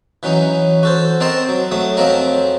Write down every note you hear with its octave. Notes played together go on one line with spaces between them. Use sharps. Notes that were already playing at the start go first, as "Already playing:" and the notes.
E3 F#3 C#4 D#4
F#4 A4 C5
C4 A#4 D#5 A5 C6
F#3
F#3 A3 D#6
F2 F3 F#3 C4 A#4 D#5